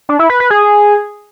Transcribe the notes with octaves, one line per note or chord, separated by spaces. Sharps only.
D4
E4
B4
B4
G#4